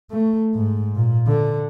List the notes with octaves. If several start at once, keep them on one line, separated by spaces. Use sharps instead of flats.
A3
G#2
A#2
D3